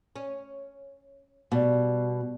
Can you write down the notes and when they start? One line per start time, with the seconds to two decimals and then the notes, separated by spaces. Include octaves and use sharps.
0.16 C#4
1.52 B2 G3